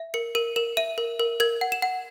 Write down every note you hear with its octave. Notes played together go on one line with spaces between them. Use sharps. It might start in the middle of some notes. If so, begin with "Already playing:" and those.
Already playing: E5
A#4 C#7
A#4 D#7
A#4 E7
E5 D#7
A#4
A#4
A#4 G#6
F#5
E7
F#5